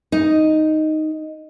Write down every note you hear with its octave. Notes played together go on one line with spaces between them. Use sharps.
D#4